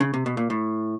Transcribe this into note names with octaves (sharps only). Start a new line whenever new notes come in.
C#3
C3
B2
A#2
A2